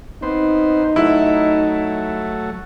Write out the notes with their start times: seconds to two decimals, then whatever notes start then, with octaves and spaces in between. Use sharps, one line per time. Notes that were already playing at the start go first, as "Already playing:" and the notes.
0.23 B3 C4 D#4 C5
0.96 F#3 A3 E4